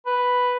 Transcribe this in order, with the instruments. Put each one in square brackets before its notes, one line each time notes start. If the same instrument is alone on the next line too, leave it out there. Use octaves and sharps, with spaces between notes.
[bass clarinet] B4